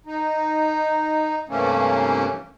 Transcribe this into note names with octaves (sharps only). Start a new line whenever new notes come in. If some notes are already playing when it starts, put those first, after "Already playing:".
D#4
G2 C3 E3 A3 A#3 C#4